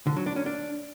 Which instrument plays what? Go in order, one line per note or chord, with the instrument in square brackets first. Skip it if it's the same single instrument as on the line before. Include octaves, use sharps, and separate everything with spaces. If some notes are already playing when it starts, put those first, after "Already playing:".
[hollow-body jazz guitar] D3
F#3
D4
C#4
D4